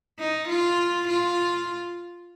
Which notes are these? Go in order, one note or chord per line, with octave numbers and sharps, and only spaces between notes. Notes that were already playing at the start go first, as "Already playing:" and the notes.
D#4
F4
F4